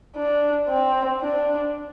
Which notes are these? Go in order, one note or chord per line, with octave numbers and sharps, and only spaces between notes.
D4
C4
D4